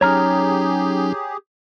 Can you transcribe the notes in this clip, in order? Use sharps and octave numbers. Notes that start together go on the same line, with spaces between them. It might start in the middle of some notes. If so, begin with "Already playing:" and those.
F#3 C#4 D#4 G4 G#4 C#5 A#5 F6